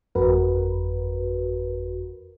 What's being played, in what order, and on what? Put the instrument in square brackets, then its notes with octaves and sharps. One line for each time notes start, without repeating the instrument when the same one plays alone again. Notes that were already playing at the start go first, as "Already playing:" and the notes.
[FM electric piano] G1 F2 F#4 A#4 B4